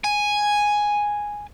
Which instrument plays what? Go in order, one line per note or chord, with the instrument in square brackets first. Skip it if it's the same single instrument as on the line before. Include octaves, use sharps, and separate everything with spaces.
[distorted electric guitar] G#5